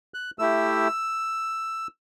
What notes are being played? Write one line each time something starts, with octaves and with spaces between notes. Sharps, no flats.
F#6
A3 E4 G4 E6